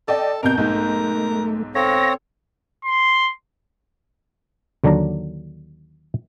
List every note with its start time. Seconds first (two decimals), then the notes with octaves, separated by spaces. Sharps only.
0.08 A4 D5 D#5 G5
0.42 F2 B2 A#4 G6
0.57 B1 G#2 A3 A#4
1.75 C4 A4 C#5 F5 A#6
2.85 C6
4.84 D#2 D3 F#3 D4 D5 A#5